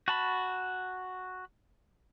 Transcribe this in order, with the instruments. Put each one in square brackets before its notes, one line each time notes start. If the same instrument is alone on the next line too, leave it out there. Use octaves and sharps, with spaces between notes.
[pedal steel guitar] F#4 A5 B5